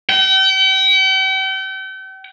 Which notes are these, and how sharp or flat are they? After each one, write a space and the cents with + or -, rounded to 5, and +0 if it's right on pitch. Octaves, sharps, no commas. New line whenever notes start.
G5 -40